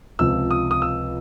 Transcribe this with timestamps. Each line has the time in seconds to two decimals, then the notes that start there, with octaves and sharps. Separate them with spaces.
0.19 C#2 C3 F3 E6
0.51 D#6
0.71 D#6
0.82 E6